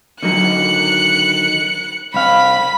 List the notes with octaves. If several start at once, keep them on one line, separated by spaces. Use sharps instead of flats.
D3 D#3 F#3 F#6 C#7
C2 F5 B5 B6